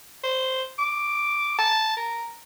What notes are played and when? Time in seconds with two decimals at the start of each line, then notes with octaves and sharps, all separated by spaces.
0.23 C5
0.79 D6
1.59 A5
1.96 A#4